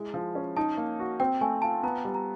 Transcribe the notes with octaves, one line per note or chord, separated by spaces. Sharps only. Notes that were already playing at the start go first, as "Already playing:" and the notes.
Already playing: G#3 E4
F3
C#4
D#4 A5
A#3
F#4
C4 G5
A3 G#5
F4 A5
B3 A#5
G3
A#5